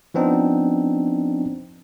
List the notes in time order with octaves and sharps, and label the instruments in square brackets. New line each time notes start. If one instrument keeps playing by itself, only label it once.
[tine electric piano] F3 B3 C4 D4 D#4